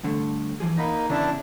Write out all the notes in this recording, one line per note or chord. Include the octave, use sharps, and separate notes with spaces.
G2 D3 A3
E3 F3 G#4
A#3 D#4 D#5 F#5 B5
E2 C#3 B3 D4 E4 A5